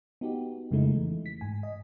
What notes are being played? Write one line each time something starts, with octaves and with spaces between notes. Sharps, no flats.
B3 D#4 F#4 G4
F2 C#3 G#3 A3 D#4 E4
E3
B6
G#2 G#5
D#5